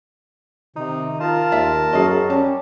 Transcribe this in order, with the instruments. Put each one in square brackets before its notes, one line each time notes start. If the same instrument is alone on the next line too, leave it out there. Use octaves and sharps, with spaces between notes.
[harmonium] C3 [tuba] D#3 [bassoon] D#4
[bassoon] F4 [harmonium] A#4 A5
[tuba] D#2 [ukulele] D5 E5
[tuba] F#2 [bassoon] F#3 [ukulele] G#4 D#5
[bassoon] G3 [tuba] C#4 [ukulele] A5